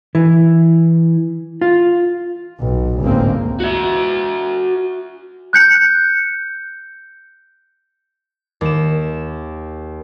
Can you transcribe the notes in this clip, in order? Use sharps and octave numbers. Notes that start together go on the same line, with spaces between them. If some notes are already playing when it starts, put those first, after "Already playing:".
E3
F4
B1
G1 C#2 A2 A#3 C4
F#4 E5
F#6 G6 C#7
D#2 E7